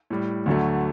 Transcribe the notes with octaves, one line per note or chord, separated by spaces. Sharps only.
A2 G3
D2 D3 F#3 A3